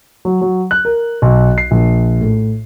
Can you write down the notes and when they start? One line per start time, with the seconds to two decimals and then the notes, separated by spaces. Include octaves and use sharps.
0.25 F#3
0.41 F#3
0.71 F#6
0.85 A#4
1.22 B1
1.58 C7
1.71 A#1
2.21 A2